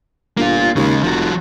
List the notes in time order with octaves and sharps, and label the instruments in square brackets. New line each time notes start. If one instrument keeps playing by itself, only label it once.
[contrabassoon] G1 [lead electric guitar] A#3 F4
[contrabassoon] D#2 [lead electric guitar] C#3 G#3
[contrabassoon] F1 [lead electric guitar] F3 F#4